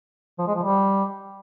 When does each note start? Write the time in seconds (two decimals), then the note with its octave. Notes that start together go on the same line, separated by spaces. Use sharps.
0.39 F3
0.47 G#3
0.55 F3
0.63 G3